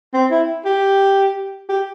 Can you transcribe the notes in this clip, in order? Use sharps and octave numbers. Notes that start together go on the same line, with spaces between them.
C4
E4
G4
G4